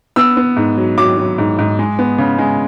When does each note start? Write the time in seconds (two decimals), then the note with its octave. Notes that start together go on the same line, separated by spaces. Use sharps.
0.16 B3 E6
0.37 B3
0.56 G#2
0.77 F#3
0.98 F#3 D6
1.17 F#3
1.38 G#2
1.59 G#2
1.79 G#3
1.99 B3
2.18 C#3
2.38 G#3